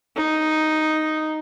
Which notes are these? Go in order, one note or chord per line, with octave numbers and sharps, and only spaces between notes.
D#4